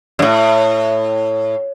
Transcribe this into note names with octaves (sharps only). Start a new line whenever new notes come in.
F#2 A2